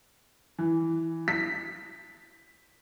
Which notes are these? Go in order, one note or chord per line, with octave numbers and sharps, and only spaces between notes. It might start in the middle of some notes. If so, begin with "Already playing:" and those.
E3
B6